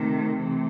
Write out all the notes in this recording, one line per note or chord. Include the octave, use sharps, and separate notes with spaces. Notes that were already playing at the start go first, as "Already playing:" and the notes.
Already playing: C3 D#3 A3
C3 E3 A3